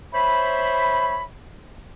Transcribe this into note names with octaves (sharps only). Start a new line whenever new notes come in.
C5 C#5 E5 B5